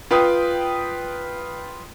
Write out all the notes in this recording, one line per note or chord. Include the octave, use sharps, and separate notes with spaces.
F4 B4 G5 D#6